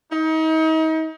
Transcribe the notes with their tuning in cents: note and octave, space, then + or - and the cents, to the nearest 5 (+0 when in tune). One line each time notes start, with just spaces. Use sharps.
D#4 +35